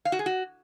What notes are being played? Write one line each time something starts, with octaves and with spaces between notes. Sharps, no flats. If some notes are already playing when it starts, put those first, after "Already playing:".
F5
F#4
G#4
F#4